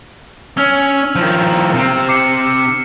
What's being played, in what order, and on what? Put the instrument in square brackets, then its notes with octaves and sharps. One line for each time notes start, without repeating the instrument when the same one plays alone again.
[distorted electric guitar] C#4 [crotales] E6 F6 F7
[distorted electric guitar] D#3 F3
C3 C4
[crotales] D6 C7 C#7